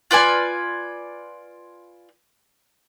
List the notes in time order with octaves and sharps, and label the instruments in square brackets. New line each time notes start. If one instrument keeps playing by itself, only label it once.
[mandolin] F4 B4 D5 G#5